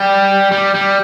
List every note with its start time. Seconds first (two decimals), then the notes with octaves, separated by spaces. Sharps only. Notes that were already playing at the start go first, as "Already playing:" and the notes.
Already playing: G3
0.52 G3
0.75 G3